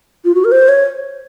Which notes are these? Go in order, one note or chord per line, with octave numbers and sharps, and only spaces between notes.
F4
F#4
A#4
C5
C#5